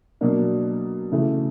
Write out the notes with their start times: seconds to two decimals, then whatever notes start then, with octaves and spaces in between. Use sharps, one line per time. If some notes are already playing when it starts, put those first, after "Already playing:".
0.21 B2 F#3 A#3 D4
1.12 C#3 E3 A3